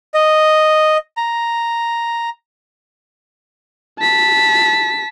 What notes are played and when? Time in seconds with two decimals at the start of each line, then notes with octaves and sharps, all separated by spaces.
0.14 D#5
1.17 A#5
3.99 A5 B6